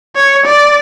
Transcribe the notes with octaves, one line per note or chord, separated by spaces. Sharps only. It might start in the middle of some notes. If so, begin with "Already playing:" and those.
C#5
D5